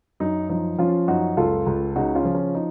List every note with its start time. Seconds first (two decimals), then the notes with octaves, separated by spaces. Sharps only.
0.20 F#2 D#4
0.49 F3 D#4
0.78 F3 C#4 F4
1.08 F#2 D#4 F#4
1.37 C#2 F4 A4
1.66 C#2
1.96 C#3 D#4 F#4
2.15 C#4 F4
2.25 F3
2.35 C#4
2.55 D#4